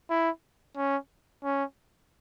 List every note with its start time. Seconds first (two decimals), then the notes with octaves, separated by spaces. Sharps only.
0.10 E4
0.76 C#4
1.44 C#4